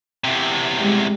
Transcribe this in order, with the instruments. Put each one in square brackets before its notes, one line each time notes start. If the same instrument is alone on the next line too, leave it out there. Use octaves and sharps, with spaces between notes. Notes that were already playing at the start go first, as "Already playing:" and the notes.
[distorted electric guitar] E2 C3
[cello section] G3 G#3